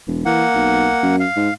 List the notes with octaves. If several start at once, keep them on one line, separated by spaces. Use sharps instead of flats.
E1
E3 A#3 F#5
B1
F#2
F5
G#2